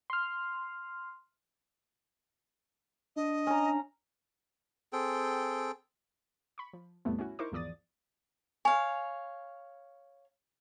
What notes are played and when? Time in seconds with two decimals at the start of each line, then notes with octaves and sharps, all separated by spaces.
0.10 C6 F6
3.16 D4 D#5
3.47 C#4 A#5
4.93 C4 G#4 A4 G5
6.58 B5 C#6
6.73 F3
7.05 E2 A2 C3 G3 A3 B3
7.19 C#4 E4 F#4
7.39 D#4 E4 A#4 C5 C#6 D6
7.52 G#1 E2 F3 D5 D#6 A6
8.65 C#5 F5 G#5